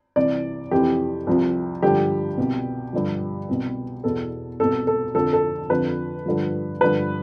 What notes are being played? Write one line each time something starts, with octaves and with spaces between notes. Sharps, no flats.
C2 C3 E3 D5
F2 C3 E3 G4
C2 C3 F3
G2 D3 F3 G4
C2 B2
G2 D3 F3
C2 B2
E2 B2 A4
C2 B2 A4
A4
F2 D3 F3 A4
A4
F2 D3 F3 B4
G2 D3 F3
G2 D3 F3 B4